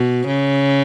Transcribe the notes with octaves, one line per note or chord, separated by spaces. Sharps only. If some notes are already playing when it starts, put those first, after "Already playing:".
Already playing: B2
C#3